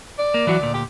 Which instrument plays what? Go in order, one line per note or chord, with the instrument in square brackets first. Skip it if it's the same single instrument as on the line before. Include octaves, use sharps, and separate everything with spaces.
[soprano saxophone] D5
[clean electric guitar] A#3
E3 F#3 F#4
D2 A#2
[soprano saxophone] G4